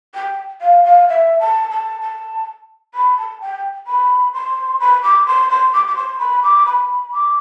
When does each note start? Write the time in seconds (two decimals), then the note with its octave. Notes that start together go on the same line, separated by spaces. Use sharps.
0.15 G5
0.62 F5
0.84 F5
1.09 E5
1.40 A5
1.71 A5
2.01 A5
2.95 B5
3.17 A5
3.41 G5
3.87 B5
4.34 C6
4.80 B5
5.03 D6
5.27 C6
5.50 C6
5.74 D6
5.88 D6
5.96 C6
6.19 B5
6.43 D6
6.66 B5
7.13 D6